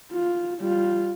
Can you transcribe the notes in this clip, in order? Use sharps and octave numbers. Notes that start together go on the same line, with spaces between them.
F4
G3 F4